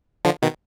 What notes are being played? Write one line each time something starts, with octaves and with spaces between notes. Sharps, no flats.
D3 F3
B2 D#3